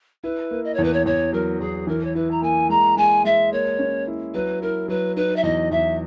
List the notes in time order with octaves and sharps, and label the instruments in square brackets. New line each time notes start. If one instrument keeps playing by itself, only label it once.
[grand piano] E4 [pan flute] B4
[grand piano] A#3
[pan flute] D#5
[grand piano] E2 [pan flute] C#5
[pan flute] B4
C#5
[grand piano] E2 [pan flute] C#5
[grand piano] F#3 [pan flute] A#4
[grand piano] E2 [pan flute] G#4
[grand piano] E3 [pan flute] A#4
[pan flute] C#5
[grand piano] E4 [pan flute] B4
[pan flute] A#5
[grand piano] A#3 [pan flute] G#5
[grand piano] G#3 [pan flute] A#5
[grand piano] G#3 [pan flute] G#5
[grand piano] G#3 [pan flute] E5
[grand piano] A#3 [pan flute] C#5
[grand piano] C#4
E4
[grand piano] F#3 [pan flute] B4
[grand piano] E4 [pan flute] A#4
[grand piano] F#3 [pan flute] B4
[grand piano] D#4 [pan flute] B4
[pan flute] E5
[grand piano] E2 [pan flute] D#5
[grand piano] E2 [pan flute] E5